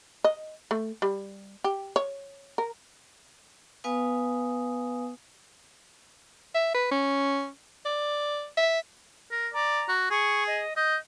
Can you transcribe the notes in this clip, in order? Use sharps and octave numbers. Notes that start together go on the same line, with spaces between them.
D#5
A3
G3
G4
C#5
A#4
B3 B4 F5 G#5 D#6
E5
B4
C#4
D5
E5
A#4
D5 A#5
F#4
G#4 C#6
D#5
D#5 G6